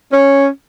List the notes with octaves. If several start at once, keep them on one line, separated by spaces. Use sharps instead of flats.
C#4